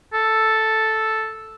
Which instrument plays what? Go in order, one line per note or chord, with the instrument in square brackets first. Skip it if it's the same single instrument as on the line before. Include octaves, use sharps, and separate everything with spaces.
[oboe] A4